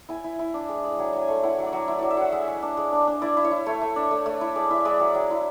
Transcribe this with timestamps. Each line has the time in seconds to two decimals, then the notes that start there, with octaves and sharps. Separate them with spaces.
0.09 E4 G#5
0.24 E4
0.39 E4
0.54 D4
0.69 G#3
0.84 G#3
0.99 F#3 G#5
1.13 F#3
1.21 G#5
1.28 A3
1.43 E4 F#5
1.59 F#3
1.66 D5
1.73 F#3
1.88 E4
1.99 F#3 D5
2.11 E5
2.17 F#3 F#5
2.32 G#3 E5
2.48 G#3
2.62 D4
2.77 G#3
2.92 D4
3.07 D4
3.22 E4 D5
3.37 E4
3.45 C#5
3.51 E4
3.66 A3 C#5
3.81 A3
3.96 D4
4.11 A3
4.26 A3
4.41 E4
4.55 G#3 D5
4.71 E4 E5
4.85 G#3 D5
5.00 F#3 E5
5.15 F#3
5.30 E4